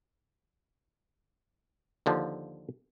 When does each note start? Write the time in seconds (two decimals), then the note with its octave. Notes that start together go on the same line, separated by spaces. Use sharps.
2.06 D#2 D3 F3